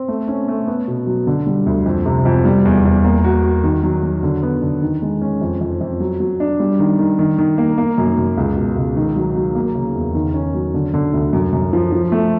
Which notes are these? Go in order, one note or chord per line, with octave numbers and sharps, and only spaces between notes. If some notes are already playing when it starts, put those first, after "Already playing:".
Already playing: C4
A3
C#4
A3
B3
B2
F#3
D3
G3
D2
F2
C3
F2
G3
E2
E2
A#3
F#4
F#4
D#3
F#3
F#3
D3
B3
D3
D#3
G#3
C#4
F2
F2
F2
F#3
F#3
D4
G3
D#3
D#3
D#3
D#3
A#3
A#3
F#2
F#2
C#2
B2
C#2
D#3
F#3
F#3
A#3
C#3
E2
D#3
C#4
F#3
D3
D3
D2
F#2
F#2
F3
F3
A3